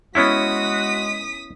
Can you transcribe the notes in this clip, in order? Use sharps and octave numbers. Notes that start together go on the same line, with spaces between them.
G#3 B3 C#4 E4 F#4 D#6 B6